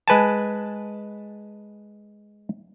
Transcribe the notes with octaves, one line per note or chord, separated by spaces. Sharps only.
G#3 B4 G#5 A5